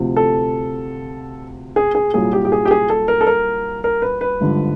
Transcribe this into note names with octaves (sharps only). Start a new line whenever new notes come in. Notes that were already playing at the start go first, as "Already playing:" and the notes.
Already playing: D2 C3 F3
A4
G#4
G#4
C2 A#2 F#3 G#4
G4
G4
G#4
G4
G#4
A4
A#4
A4
A#4
A#4
B4
B4
G#1 G2 D3 F3